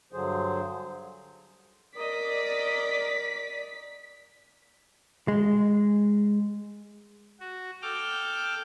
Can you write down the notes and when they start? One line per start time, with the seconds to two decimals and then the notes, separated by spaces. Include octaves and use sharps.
0.13 G2 D3 F#3 G#4 C5
1.97 A#4 D5 D#5 B6
5.28 G#3
7.40 F#4
7.82 A4 G5 D6 F6